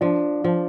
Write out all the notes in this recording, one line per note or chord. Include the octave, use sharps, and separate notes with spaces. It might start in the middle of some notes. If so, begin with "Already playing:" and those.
F3 D4
F3